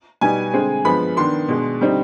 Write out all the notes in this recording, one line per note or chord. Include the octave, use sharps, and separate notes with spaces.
B2 G3 B3 D#4 G#5
D3 G#3 C4
G2 F3 G#3 B3 B5
D#3 B3 D4 C6
B2 G#3 D4
D3 G3 C4 D#4